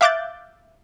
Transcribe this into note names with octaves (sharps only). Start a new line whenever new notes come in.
E5 F5 D6 F#6 G6 A6